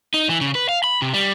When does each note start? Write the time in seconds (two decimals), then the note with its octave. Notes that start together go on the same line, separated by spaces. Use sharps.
0.14 D#4
0.29 E3
0.41 C#3
0.55 B4
0.69 F5
0.84 B5
1.02 C3
1.14 G3